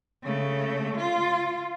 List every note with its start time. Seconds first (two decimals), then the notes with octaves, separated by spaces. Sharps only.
0.22 C#3 A3
0.97 F4